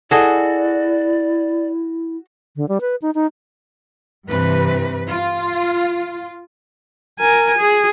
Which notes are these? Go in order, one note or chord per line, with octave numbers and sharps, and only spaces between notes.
E4 F#4 G#4 A4 D5 D#5
D3
G3
B4
D#4
D#4
G2 C3 E3 B4
F4
A#4 G#5
G#4